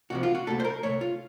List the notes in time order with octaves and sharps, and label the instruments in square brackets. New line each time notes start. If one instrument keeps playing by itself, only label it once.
[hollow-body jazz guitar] C2 C3 F3 F#4
F4
F#4
C2 A#2 A3 A4
C5
A#4
C2 A#2 A3 C#5
F4